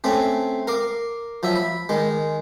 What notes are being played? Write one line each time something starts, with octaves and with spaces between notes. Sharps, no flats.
A3 C4 C#4
A#4 F5 D6
F3 F#3 E5
B5
D#3 G#3